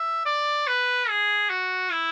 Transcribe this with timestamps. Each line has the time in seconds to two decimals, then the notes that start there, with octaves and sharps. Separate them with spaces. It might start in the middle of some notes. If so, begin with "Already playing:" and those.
Already playing: E5
0.26 D5
0.67 B4
1.09 G#4
1.50 F#4
1.92 E4